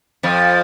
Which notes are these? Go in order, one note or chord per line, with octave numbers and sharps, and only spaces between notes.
F2 F3